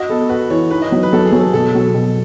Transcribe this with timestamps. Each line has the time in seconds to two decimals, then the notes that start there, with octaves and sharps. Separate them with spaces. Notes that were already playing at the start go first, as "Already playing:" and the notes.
Already playing: F#4 D#5
0.09 B3 A4
0.29 F#4 B4
0.50 E3 C#5
0.71 D#4 B4
0.82 D#5
0.92 F#3
1.03 B4
1.13 F#3 A4
1.26 G#4
1.32 F#3
1.39 A4
1.53 B2 A4
1.75 F#3
1.95 B2